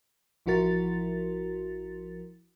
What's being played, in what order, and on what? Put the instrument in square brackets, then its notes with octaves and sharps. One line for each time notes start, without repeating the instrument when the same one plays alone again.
[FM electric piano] A1 F3 E4 F#4 A#4 A6